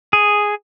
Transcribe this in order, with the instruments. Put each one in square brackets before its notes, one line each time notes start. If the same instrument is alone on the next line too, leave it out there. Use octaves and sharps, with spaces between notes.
[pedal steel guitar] G#4